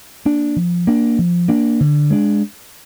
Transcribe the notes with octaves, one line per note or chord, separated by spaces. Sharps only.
A#3 D4
F3
A#3 D4
F3
A#3 D4
D3
G#3 D4